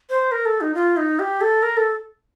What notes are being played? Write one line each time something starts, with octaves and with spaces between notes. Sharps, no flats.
C5
A#4
A4
D#4
F4
D#4
G4
A4
A#4
A4